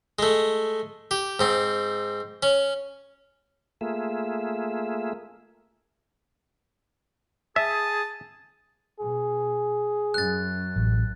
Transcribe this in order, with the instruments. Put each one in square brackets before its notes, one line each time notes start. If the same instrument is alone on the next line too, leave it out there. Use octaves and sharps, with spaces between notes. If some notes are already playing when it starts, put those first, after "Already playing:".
[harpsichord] G#3 A3
G4
G#2 C4
C#4
[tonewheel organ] A3 A#3 F4 G#4 E5
[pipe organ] G#4 D#6 [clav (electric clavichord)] E5 [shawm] A5
[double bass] B2 [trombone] G#4
[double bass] F#2 [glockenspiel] F#6 A6
[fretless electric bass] A1